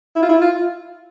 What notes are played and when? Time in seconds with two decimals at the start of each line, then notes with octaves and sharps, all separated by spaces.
0.16 E4
0.23 F4
0.29 E4
0.42 F4